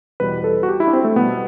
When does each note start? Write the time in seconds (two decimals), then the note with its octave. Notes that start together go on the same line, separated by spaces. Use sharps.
0.20 E2 B2 G3 B4
0.44 A4
0.63 F#4
0.69 G4
0.80 E4
0.87 D4
0.93 C4
1.04 A3
1.16 B2 G3 B3